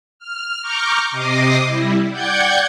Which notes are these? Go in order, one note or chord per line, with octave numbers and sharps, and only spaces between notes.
F6
A#5 C#6 D6 F6 G6
C3 D#5 D6 D#6 A#6 C7
G3 E4
D5 F#5 G5 G6 G#6 C#7